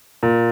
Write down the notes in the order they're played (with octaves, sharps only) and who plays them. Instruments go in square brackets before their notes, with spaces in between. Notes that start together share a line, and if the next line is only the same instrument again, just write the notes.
[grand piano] A#2